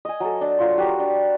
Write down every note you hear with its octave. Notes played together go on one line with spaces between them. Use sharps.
D#5 G#5
F#3 A4
D4
F#3 F4 C6
F#4 G4 A#4
D4